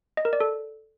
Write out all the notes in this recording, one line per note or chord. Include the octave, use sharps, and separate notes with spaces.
D#5
A#4
D5
A4